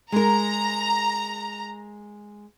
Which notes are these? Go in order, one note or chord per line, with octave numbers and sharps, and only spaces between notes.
G#3 A#4 A#5